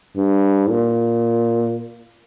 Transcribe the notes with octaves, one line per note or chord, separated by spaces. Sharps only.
G2
A#2